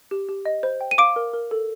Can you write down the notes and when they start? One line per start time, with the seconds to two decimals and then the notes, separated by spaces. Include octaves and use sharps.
0.11 G4
0.29 G4
0.45 D#5
0.63 C5
0.81 G5
0.91 D#7
0.98 F5 D6 D7
1.16 A#4
1.34 A#4
1.51 A4